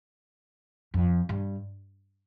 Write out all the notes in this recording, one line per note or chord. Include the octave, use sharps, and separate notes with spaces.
F2
G2